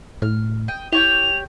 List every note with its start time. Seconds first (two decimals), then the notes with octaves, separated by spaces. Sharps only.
0.22 A2 F6
0.68 D#5 G5
0.92 E4 G4 C#5 G5 F7